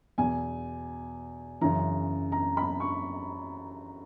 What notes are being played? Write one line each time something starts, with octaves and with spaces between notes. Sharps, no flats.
E2 B2 G#5
F#2 C#3 E3 A#5
A#5
B5
C#6